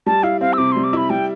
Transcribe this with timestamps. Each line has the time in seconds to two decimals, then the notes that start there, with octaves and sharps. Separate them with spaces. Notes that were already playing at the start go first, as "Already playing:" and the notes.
0.06 G3 A5
0.23 E4 F5
0.41 C4 F5
0.53 E6
0.58 C3 D6
0.72 G3 C6
0.84 D6
0.93 E4 B5
1.10 G3 G5